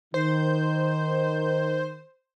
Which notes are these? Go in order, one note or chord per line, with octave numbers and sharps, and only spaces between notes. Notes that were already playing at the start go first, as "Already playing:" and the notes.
D#3 C5